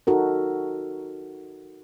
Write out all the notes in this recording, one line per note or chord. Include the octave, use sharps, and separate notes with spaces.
D#4 F#4 A4 A#4